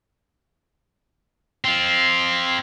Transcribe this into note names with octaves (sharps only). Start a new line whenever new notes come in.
C4 F4